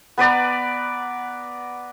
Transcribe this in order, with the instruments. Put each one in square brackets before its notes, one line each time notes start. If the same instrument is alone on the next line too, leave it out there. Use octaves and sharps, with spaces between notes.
[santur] B3 B4 D5 A#5